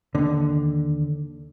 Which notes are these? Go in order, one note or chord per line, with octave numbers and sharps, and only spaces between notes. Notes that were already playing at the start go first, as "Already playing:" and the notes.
D#2 D3